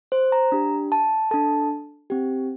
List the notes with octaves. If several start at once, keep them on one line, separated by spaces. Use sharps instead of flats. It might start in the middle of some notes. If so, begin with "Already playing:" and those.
C5
A#5
D4 G4
A5
D4 A4 A5
C4 G4